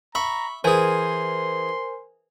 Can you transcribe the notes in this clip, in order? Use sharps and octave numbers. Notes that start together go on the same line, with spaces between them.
E5 A#5 B5 C#6
E3 G#4 A#4 C5 G#5 C6